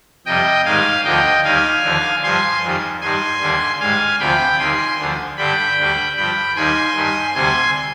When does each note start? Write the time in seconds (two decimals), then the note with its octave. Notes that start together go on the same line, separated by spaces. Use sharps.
0.26 F2 C3 G3 D#5 G5
0.65 G#2 D#3 G3 F5 G#5
1.05 D2 D3 F3 D#5 G5
1.44 D#2 D#3 G3 F5 G#5
1.83 D#2 D3 F3
2.23 G2 F3 G#5 C6
2.63 F2 D#3 G3
3.01 G2 D#3 G3 G#5 C6
3.41 D#2 D3 G3
3.80 G#2 G3 F5 G#5
4.19 D2 C3 F3 G5 B5
4.59 D#2 D#3 G3 G#5 C6
4.99 D2 D3 F3
5.37 G2 D3 G3 G5 B5
5.77 D2 D3 G3
6.16 G2 F3 G5 B5
6.56 D#2 D#3 G3 G#5 C6
6.95 G2 D#3 G3
7.35 D2 C3 G3 G#5 C6